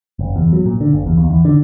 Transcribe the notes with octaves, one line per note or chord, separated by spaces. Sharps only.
F#1
E2
F#3
A#2
D3
F#1
E2
D#2
E2
D3